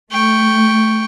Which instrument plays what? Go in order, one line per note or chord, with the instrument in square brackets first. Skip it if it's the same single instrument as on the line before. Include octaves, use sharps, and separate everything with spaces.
[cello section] A3 [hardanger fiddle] G5 C#6